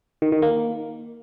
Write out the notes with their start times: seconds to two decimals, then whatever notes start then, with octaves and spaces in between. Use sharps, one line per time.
0.22 D#3
0.32 D#3
0.42 A#3